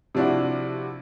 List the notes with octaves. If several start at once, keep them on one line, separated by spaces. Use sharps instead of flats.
C3 F3 D4 E4 F#4